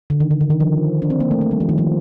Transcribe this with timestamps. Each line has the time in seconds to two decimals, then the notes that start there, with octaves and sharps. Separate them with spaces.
0.10 D3
0.20 D#3
0.31 D3
0.41 D3
0.50 D#3
0.60 F3
1.02 D4
1.10 C4
1.20 A#3
1.31 A3
1.41 A3
1.51 G3
1.60 F3
1.69 D#3
1.78 F3